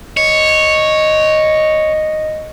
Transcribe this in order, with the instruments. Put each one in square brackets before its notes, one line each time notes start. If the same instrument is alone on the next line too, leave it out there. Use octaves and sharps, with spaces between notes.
[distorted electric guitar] C#5 [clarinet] D#5